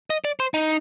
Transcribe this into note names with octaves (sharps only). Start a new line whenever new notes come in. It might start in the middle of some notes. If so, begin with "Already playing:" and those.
D#5
D5
C5
D#4